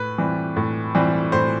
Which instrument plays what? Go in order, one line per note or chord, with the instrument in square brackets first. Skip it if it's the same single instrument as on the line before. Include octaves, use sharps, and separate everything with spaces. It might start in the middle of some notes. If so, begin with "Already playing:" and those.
Already playing: [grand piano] A2 B4
E3 G3 C4
A2
E3 G3 C4
A2 C5